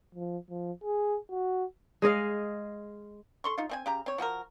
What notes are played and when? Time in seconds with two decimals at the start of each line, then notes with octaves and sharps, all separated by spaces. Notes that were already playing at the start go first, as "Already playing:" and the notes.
0.15 F3
0.50 F3
0.84 G#4
1.30 F#4
2.02 G#3 G#4 D#5 F5
3.44 A4 C6 C#6
3.58 D#4 F4
3.69 A3 C4 G#5
3.86 C#3 G4 A#5
4.06 C4 C#5
4.18 F3 F#4 G#4 A#4